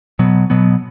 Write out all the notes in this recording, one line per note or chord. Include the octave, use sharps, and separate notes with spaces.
B2 F#3 B3
B2 F#3 B3